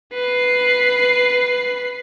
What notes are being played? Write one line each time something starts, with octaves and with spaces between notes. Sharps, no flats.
B4 C7